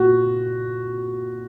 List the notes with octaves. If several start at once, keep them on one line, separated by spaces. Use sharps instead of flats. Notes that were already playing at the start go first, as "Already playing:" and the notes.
Already playing: A#2 F#4